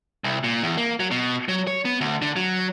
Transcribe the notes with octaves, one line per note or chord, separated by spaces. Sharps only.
C2
A#2
E2
A#3
F#3
B2
F#3
C#5
B3
D2
D3
F#3